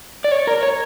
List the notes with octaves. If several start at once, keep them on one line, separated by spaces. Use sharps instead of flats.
D5
C#5
A#4
C#5